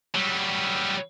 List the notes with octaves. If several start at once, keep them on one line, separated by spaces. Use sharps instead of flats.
F#3 G3